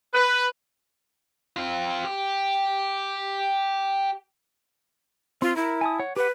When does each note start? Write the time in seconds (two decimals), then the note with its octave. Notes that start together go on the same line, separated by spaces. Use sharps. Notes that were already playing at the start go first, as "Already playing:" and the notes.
0.14 B4
1.56 C4 F4
2.05 G4
5.42 C4 F4
5.56 E4 A#4
5.81 G#5 A5 D#6
6.00 C#5 F#5
6.16 G4 B4 F#5